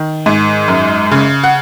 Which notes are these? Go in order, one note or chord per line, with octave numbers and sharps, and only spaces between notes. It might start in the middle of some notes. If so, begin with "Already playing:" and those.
Already playing: D#3
G#2
F#2
C#3
F#5